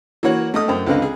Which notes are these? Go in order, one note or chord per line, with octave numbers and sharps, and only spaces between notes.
E3 A#3 F#4 C#5 F#5
A3 D#5 D#6
F#2 C5 G5
C#2 D3 C4 B4 D#5 F5
G#4